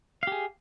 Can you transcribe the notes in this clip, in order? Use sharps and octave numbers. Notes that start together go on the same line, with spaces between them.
G4 G#4 F5